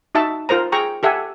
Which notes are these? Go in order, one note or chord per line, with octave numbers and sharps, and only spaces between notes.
D#4 F#4 E5 A5
F4 A#4 C5 A#5
G#4 G5 A#5 C#6
G4 A4 E5 F#5 G#5